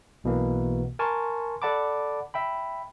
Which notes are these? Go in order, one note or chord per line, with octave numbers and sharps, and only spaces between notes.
B1 B2 E3 A#3
A#4 G#5 A5 C6 C#6
A4 D5 F#5 A5 B5 D6
E5 G5 B5